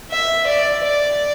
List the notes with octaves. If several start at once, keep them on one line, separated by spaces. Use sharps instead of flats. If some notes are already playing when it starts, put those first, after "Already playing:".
E5
D5
D5